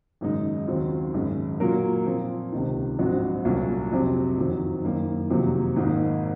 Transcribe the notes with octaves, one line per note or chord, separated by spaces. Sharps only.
G#1 F#2 C#3 G#3 D#4
D#2 C#3 F#3 C4 F4
G#1 F#2 C#3 G#3
A#2 F#3 A#3 F4 A#4
A#2 F3 C4 F4
C#2 C3 D#3
A#1 G#2 F#3 C4 F#4
C2 A#2 F#3 C#4
F2 C3 F#3 C4
F#1 F2 D#3 F#3
F#1 F#2 D#3 A#3
F2 C3 D#3 F#3 A#3
G#1 G#2 D#3 A#3 D#4